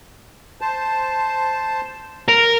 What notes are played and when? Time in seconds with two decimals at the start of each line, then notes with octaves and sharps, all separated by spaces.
0.61 C5 A5
2.28 A#4